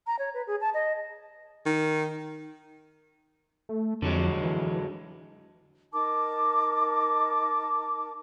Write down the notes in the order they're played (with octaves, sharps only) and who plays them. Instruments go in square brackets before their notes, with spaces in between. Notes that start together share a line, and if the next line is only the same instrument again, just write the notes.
[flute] A#5
C#5
B4
G#4
A5
D#5
[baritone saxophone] D#3
[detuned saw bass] A3
[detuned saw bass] F2 [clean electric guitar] D3 F#3 G#3
[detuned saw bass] E3
[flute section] D#4 A#4 A5 D6